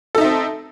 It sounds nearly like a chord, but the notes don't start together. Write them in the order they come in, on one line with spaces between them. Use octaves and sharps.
A4 D#4 E5 C4